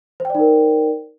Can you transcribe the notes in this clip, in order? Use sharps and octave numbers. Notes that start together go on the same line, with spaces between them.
D#4 A#4 C5 D5 G5